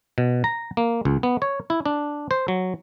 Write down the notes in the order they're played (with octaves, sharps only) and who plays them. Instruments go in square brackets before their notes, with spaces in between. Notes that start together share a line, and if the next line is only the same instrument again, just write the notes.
[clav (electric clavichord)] B2
A#5
A#3
C#2
B3
C#5
E4
D4
C5
F#3